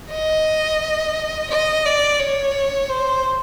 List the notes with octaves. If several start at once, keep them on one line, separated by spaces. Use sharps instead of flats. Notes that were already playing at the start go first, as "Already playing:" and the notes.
D#5
D#5
D5
C#5
C5